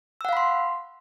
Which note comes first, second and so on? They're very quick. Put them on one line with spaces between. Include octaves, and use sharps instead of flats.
E6 F#5 F5 B5 C6